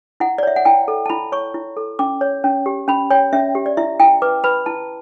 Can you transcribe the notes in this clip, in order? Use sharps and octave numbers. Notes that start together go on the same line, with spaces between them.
E4 F#5
D5
C#5 E5
F#5
E4 G5
A4
A5
E4 B5
C#5 C#6
E4
A4
C#4 D6
C#5
C#4
G4
C#4 B5
C#5 G5
C#4 E5
G4
D5
E4 E5
E4 G5
B4 D6
B4 B5
E4 A5